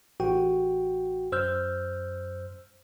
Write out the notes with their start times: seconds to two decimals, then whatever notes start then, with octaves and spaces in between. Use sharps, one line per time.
0.20 A1 F#4 G5
1.32 F#2 C5 E6 F6 G6